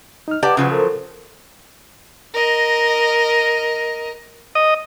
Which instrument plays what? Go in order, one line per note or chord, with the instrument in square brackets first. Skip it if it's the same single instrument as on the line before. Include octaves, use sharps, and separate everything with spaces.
[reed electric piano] D#4 F6
[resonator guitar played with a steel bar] G4 D5 A5 [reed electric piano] B4 F#5
[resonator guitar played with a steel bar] C#3 F3 F#3
[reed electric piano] A4 A#4 C5
[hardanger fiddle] A#4 D#5
[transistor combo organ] D#5